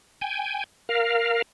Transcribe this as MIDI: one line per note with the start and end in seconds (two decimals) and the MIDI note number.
0.21 0.64 79
0.21 0.64 80
0.89 1.42 70
0.89 1.42 77